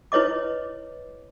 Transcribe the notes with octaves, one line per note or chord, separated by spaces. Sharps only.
E4 B4 C#5 D#5 D6